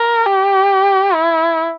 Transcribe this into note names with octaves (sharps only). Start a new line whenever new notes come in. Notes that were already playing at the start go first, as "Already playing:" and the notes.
Already playing: A#4
G4
E4